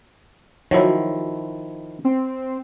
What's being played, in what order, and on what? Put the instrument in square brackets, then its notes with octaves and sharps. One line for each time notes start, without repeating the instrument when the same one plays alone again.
[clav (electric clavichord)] D#3 F3 E4 [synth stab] F#3
[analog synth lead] C4